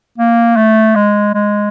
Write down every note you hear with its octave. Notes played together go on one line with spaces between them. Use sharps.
A#3
A3
G#3
G#3